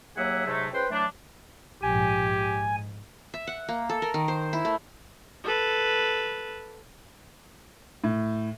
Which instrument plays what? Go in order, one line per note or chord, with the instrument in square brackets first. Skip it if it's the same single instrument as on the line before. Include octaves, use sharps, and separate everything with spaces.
[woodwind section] D#2 F#3 A#3 G#4 E5 F#5
G#2 C3 F#3 G#3 A3
C#2 B4 C5 G5 C6
E3 F#3 A3 D4
[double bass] A#1 G#2 [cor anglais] G4 [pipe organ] G#5
[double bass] G#2
[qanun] E5
F#5
A#3
A4
A#4
D#3
C5
E4
A3
[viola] A4 B4
[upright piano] A2